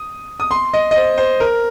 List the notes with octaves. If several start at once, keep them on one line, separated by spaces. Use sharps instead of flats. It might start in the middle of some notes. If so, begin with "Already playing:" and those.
Already playing: D#6
D#6
C6
D#5
D#5
C5
C5
A#4